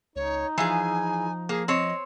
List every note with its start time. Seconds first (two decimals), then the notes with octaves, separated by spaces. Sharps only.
0.16 C#2 D#4 C#5
0.58 E3 F3 F4 G#4 G#5
1.49 A#3 G#4
1.68 C4 C#5 D#5